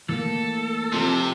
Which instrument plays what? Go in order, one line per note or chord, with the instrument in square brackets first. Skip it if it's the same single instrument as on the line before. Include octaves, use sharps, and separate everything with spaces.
[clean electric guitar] E3 A3 A#3 [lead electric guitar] A4
[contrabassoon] F2 [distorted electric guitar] C3